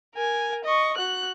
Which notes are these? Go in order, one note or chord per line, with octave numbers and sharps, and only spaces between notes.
A#4 G#5
D#5 C#6
F#4 F#6